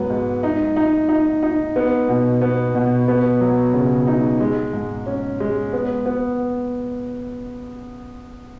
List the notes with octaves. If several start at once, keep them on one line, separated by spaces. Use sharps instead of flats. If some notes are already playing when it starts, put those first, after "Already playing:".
Already playing: G#2 F#3 B3
G#2
D#4
D#4
D#4
D#4
B3
B2
B3
B2
B3
F#3
C#3
D#4
G#3
G#2
C#4
G#3
B3
B3